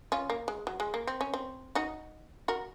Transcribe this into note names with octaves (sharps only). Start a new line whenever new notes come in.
C#4 F4
A#3
G#3
F#3
G#3
A#3
C4
C#4
C4
D#4 F#4
F#4 A#4